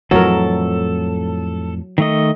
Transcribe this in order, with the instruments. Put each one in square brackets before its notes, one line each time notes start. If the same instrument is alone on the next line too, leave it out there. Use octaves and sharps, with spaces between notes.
[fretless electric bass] F2 A2 E3 [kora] F#3 A#4 [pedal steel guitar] A4
[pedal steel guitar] D#3 A3 D#5